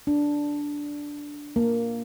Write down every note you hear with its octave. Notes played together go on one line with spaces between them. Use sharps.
D4
A#3